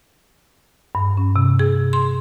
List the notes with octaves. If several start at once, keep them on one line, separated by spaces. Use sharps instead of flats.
G2
C#4
C3
G#4
C6